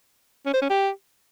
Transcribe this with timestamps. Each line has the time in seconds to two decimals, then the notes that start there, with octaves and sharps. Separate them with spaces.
0.46 C#4
0.54 C5
0.62 C#4
0.70 G4